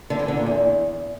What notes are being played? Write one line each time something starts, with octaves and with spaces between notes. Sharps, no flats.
D3
E3
D3
A#2
E2